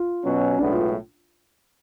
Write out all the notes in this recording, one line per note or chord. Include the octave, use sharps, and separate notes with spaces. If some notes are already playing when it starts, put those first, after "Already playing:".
Already playing: F4
B2 F#3 C#4
B1 A2 G#3 B3 D4
F4